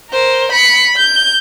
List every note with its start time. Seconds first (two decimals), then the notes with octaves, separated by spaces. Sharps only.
0.10 A#4 C5
0.52 B5 C#7
0.97 G6